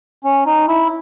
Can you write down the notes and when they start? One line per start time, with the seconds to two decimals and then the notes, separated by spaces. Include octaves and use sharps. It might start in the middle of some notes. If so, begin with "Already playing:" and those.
0.24 C#4
0.46 D#4
0.68 E4